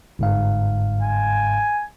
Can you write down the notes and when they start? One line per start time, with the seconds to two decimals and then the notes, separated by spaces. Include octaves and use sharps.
0.19 G1 G#2 F5
1.02 G#5